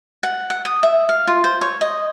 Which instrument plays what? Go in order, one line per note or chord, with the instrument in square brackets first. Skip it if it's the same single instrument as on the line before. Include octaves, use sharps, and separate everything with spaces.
[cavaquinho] F#5
F#5
D#6
E5
F5
F4
C5
C#5
D#5